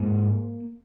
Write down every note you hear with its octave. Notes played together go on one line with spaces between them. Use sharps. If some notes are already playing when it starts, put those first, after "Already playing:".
Already playing: G#2 A#3